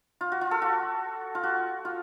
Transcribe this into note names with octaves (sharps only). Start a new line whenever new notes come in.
F4
F#4
F4
A4
F#4
F4
F#4
F4